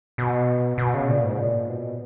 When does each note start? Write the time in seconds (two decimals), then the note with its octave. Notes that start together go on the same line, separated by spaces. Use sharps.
0.18 B2
0.78 B2
0.94 C#3
1.09 A#2
1.24 G#2
1.38 A#2
1.69 B2